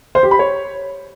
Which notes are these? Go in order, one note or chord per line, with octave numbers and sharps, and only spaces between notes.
C5
G4
B5
C#5